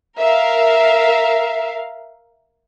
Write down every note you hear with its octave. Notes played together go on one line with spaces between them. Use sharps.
A#4 E5 F5